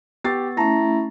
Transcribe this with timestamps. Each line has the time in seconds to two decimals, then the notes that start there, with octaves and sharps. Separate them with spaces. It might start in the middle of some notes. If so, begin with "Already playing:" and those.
0.24 B3 G4 A6 C7
0.57 A3 C#4 E4 A5 A#5 A#6